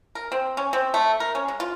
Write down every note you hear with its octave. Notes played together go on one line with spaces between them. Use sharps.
A#4
C4
C#4
C4
A3
A#4
C#4
G#3
F4